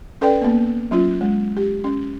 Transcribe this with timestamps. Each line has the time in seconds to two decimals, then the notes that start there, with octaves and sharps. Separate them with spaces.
0.21 C#4 A4 B4 D5 G5
0.41 A#3 B3
0.91 F#3 C#4 F4
1.21 G#3
1.57 G4
1.84 C#4